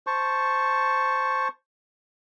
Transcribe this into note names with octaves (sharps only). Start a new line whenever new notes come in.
C5 A5 C#6